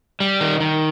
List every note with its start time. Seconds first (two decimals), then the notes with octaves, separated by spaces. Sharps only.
0.20 G3
0.41 D#3
0.60 D#3